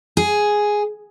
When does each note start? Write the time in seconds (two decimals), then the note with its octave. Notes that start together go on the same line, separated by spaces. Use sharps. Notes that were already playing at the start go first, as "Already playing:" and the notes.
0.17 G#4